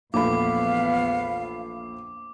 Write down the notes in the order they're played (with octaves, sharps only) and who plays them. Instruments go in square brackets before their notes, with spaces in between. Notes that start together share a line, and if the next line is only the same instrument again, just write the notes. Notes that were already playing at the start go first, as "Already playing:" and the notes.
[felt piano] A#1 A3 B5 [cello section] E2 F3 B3 [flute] F5 [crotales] D6